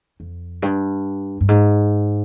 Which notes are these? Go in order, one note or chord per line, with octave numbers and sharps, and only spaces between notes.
F2
G2
G2
G#2